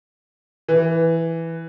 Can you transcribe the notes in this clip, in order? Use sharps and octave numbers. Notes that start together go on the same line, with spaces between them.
E3